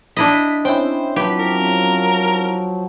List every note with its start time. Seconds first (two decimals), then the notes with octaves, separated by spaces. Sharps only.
0.17 D4 E4 D#5 B6
0.65 C4 C#4 E4 C5 G5
1.16 F3 F#3 G4 B4
1.39 A#4